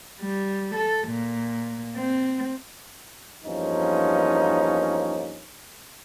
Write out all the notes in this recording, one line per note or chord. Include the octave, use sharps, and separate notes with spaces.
G3
A4
A#2
C4
E2 G2 F3 A#3 C#4 D#4